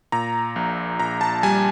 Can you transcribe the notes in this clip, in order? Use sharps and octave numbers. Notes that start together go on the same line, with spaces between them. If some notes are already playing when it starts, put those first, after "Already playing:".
A#2 A#5
A#1
A#1 A#5
A5
G3 G#5